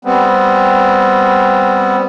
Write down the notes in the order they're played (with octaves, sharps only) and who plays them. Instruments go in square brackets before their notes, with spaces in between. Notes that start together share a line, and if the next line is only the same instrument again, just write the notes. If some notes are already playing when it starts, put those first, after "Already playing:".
[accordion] G3 B3 C4